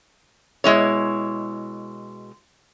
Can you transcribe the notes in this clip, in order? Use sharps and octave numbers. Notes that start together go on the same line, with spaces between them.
B2 G#3 E4 C#5